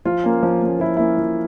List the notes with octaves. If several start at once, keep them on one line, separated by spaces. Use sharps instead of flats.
F3 F4
A#3 C#4
F3
A#3 C#4
F3 E4
A#3 C#4 E4
F3